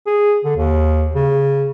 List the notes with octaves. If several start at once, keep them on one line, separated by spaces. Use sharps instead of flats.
G#4
D3
D#2
C#3